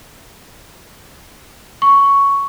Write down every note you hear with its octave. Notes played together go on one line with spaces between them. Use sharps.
C#6